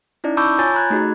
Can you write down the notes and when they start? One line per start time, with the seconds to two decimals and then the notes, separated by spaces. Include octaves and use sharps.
0.24 C#4 D#4 E4 D5
0.37 A5 B5 C#6 D6 E6 G6
0.58 F4 C#5 G#5 G6 A6
0.74 A#5 B5 F#6 G#6
0.90 A3 D#4 F#4 G#4